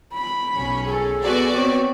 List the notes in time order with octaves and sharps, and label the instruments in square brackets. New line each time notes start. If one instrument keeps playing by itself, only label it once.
[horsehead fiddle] B5
[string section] B1 C#4
[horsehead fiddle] G#4 A4
[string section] B3 F#4 D5
[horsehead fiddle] C4 C#5